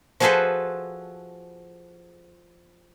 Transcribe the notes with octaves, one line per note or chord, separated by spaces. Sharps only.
F3 F#4 G#4 A4 B4 C5